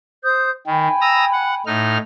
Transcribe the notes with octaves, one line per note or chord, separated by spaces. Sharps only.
C5 D#6 G6
D#3 G5 G#5 B5
A#5 D#6 E6
F#5
A2 D#4 F6